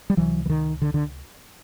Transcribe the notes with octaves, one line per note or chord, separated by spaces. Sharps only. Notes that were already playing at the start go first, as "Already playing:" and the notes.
G3
C#2 C3 E3 F#3
E3
D#3
D3
D3